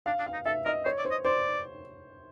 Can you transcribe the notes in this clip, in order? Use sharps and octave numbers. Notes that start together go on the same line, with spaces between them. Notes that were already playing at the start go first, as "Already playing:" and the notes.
D4 F5
D4
F5
D#4
A4 E5
A#4 D#5
C5 C#5
D5
C5
D#5
C5 D5